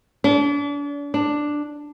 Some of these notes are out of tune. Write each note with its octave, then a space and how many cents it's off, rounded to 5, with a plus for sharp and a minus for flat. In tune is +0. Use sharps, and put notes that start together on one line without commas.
D4 -40
D4 +5